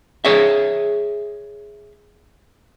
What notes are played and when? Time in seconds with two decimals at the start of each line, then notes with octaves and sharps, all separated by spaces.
0.25 G#4 C#5 E5